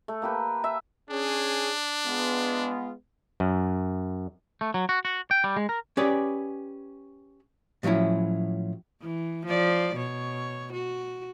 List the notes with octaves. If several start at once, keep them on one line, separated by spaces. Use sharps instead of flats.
A3
A#3 G4 B4
E5
C#4 D4 G#4
G#3 B3 F4
F#2
A3
F#3
F#4
F#4
G5
G3
G#3
A#4
C#4 G4 G#4 B4 D5
A2 F3 F#3 C#4 E4
E3
F3 D5
B2 C#5
F#4